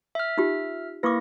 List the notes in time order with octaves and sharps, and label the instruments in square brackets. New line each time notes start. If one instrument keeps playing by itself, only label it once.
[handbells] E5 F6
[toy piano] D#4 F4 G4
[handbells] A#3 E4 A#6 [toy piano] B4 C#6 D6